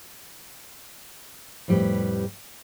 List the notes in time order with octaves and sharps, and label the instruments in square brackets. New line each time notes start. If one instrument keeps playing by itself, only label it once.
[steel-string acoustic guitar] F2 A2 G3 G4 B4